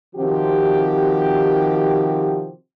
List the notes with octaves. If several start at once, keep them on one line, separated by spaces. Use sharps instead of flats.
C3 D#3 F3 C4 F#4 G4